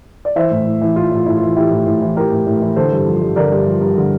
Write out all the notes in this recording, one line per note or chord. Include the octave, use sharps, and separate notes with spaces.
D5
E3 C5 E5
A2
A2
E3
E3 F4
A2
F4
A2 E4
F4
E3
E3 E4 G4
A2
A2
E3
E3 G4 A#4
A2
A2
E3
D3 A4 C5
G2
F3
G2
D3 A#4 D5
G2
F3
G2
D3